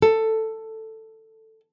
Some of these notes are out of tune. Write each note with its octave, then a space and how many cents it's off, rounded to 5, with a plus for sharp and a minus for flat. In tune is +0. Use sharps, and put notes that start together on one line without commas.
A4 +10